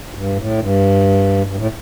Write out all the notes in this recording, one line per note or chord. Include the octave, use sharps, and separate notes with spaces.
G2
A2
G2
G2
A2